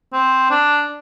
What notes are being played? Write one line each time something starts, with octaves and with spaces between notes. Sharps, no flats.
C4
D4